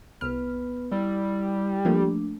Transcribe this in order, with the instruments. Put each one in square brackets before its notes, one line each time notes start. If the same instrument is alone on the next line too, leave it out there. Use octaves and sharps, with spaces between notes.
[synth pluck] C2 F6 [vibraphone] B3 B4
[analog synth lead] G3 [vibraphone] E4
[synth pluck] F3 A3 A#3 [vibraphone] D4